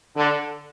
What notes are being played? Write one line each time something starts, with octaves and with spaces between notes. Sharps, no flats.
D3